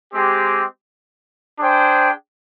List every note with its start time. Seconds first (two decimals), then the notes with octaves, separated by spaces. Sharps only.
0.13 G#3 C4 G4
1.60 D4 G#4 C5 G5